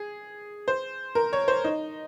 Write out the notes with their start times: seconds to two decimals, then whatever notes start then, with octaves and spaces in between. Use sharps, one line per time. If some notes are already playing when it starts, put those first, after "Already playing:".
Already playing: G#4
0.68 C5
1.15 A#4
1.33 C#5
1.48 C5
1.64 D#4